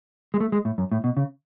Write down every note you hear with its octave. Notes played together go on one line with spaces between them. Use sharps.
G#3
A3
G#3
A2
F#2
A2
B2
C#3